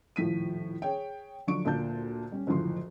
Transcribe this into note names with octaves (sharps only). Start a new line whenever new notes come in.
D#1 A2 F3 B6 D#7
G#4 C#5 G5
D3 F3 F#3 D4 C#6 D7
D2 A#2 D4 A5 G6
G3 C#4
F#1 D2 A2 F3 C6